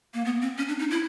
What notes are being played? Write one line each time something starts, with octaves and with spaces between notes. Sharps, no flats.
A#3
B3
C4
C#4
D4
D#4
E4